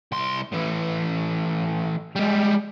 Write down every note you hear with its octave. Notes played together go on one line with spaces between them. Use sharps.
C2 C6
A2 E3
G3 G#3